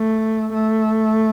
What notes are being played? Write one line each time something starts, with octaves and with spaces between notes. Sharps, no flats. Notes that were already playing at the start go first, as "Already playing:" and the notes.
Already playing: A3
A3